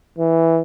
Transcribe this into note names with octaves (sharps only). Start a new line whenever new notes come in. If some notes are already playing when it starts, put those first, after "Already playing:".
E3